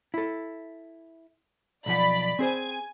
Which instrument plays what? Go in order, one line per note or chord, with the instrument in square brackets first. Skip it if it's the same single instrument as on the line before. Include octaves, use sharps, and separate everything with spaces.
[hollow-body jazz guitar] E4 A4
[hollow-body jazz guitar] B1 F3 F#5 [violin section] D5 B5
[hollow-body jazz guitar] C4 G#4 C5 [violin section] G#5